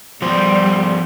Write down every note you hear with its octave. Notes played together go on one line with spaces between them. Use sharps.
F3 G3 B3 C5 C6